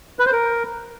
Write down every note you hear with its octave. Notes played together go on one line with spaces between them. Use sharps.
B4
C5
A#4